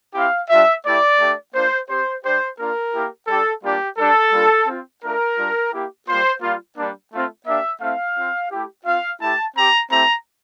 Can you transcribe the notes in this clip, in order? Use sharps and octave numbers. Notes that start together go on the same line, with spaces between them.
C4 E4 G4 F5
G3 D4 F4 E5
A3 E4 G4 D5
A3 D4 G4
A#3 D4 F4 C5
C4 G4 C5
G3 D4 G4 C5
A#3 D4 F4 A#4
A#3 E4 G4
G3 D4 G4 A4
G3 A#3 D4 F4 G4
G3 D4 G4 A4
G3 A#3 D4 F4
C4 F4
A3 D4 F4 A#4
G3 D4 F4
A#3 E4 G4
G3 A#3 F4 C5
G3 A#3 F4
G3 A#3 D4
A3 C4 F4
A#3 D4 G4 E5
A3 C4 E4 F5
C4 F4
A3 E4 G4
C4 F4 F5
A3 E4 G4 A5
C4 G4 A#5
A3 C4 E4 G4 A#5